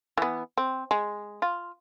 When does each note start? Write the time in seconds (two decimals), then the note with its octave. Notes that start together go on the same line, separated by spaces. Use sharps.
0.18 E3 B3
0.58 C4
0.91 G#3
1.42 F4